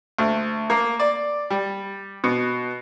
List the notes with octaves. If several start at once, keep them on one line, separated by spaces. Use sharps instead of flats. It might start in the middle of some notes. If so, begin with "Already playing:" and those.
D2
A#3
D5
G3
B2